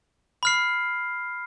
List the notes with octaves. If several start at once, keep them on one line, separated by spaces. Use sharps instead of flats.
B5 F6 C7